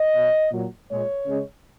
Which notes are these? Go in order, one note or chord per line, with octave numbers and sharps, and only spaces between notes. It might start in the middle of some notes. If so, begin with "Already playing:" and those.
Already playing: D#5
B2 F#3
A#2 F#3
A#2 G#3 C#5
C#3 G#3